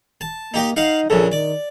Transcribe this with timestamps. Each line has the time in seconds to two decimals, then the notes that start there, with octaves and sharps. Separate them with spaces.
0.21 A5
0.54 A#3 D#4 G4 D#5
0.76 D#4 F5 F#5
1.10 A#1 C#3 A4
1.32 D#3 D5